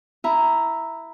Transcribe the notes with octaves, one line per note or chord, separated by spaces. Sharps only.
E4 A#5